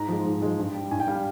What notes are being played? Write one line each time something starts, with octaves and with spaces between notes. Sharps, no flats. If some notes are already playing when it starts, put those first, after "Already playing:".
Already playing: G#2 A#5
F3 G#3
G#2
F3 G#3
G2
G3
G2 G#5
G5
G3 F5